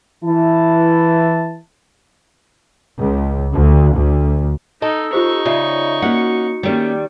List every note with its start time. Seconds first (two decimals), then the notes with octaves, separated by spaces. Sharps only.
0.24 E3 E4 A5
2.98 C#2
3.53 D2
3.95 D2
4.82 D#4 A4 D#5
5.13 D#4 F4 G4 C5 C#6
5.46 C#3 F4 D5 E5
6.02 A#3 C#4 F#4 F#5 C#7
6.63 D#3 G3 A3 A#3 C#4